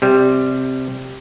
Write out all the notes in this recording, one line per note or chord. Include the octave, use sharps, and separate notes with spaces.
C3 G3